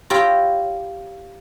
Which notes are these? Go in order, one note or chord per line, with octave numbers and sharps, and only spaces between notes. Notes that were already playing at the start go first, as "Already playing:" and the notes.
E4 F4 G4 C#5 G5 A#5